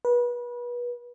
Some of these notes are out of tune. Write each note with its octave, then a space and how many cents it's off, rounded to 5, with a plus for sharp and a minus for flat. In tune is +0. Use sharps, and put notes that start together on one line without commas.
B4 -30